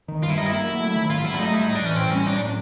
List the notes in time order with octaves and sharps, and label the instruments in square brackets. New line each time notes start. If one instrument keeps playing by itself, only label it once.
[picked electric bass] D#3
[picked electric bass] G2 [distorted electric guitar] F4
[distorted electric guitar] E4
[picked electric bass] G3 [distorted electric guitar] D#4
[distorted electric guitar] E4
[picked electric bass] A#3
F#3
A3
D#3
[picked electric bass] G#2 [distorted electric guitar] F4
[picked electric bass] F#3 [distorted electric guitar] E4
[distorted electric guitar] D4
[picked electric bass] A3 [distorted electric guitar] D#4
[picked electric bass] G3 [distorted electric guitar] E4
[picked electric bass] A2 [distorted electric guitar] D#4
[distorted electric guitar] D4
[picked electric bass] E3 [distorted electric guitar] C#4
[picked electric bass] A2 [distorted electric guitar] C4
[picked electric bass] G3 [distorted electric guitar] C#4
[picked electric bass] A2 [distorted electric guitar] D4
[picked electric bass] F#3